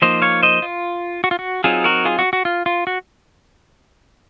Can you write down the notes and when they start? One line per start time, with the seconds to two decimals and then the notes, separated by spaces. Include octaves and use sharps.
0.02 F3 A#3 D#4 C5 D#5
0.22 C#5 F5
0.43 C5 D#5
0.62 F4
1.24 F#4
1.31 F4
1.39 F#4
1.64 F#3 C4 D#4 F4 G#4
1.84 F#4 A#4
2.05 F4 G#4
2.19 F#4
2.33 F#4
2.45 F4
2.66 F4
2.87 F#4